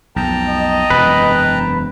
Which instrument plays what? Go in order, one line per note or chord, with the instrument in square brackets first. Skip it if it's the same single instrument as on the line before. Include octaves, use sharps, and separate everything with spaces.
[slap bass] B1 F2 [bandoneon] G5 A5 A#5
[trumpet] D#5
[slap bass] E1 F#2 C3 [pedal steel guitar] B4